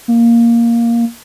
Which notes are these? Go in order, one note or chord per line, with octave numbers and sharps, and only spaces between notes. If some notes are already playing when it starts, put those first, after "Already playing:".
A#3